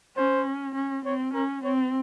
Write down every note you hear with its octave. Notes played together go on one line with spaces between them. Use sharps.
C#4 C5
C#4
C4 C#5
C#4 A#4
C4 C#5